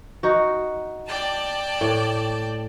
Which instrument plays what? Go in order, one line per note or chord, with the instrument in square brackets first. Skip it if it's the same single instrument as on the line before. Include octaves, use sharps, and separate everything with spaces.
[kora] D#4 F#4
[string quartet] D5 G5 A5
[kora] A2